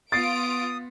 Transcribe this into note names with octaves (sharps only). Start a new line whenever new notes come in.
B3 F4 D#6 A6 C7 D7